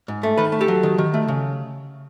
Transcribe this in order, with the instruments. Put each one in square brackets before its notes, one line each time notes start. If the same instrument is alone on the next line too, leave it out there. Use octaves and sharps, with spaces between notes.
[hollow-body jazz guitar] G#2
A3
D#3 A4 B4
A3
G4 A4
F#3
D#3
D#3
A3
C#3